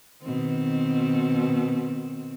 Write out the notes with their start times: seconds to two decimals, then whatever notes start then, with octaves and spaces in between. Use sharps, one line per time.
0.23 B2 D#3 C4